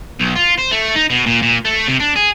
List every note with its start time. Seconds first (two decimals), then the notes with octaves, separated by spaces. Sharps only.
0.20 B1
0.35 F4
0.58 C5
0.71 A3
0.96 D#4
1.10 B2
1.26 A#2
1.42 A#2
1.65 A3
1.88 C3
2.00 D4
2.16 G#4